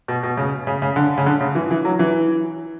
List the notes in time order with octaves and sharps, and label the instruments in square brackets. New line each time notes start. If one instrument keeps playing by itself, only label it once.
[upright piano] B2
B2
C#3
C#3
C#3
D3
C#3
D3
C#3
E3
E3
F#3
E3